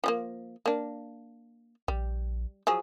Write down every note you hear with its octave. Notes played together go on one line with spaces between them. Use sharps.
F3 G#3 A#3
A#3 D4
A#1 G3
F3 F#3 G#4